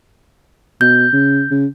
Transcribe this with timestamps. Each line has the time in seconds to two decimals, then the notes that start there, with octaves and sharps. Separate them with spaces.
0.81 B2 G6
1.13 C#3
1.51 C#3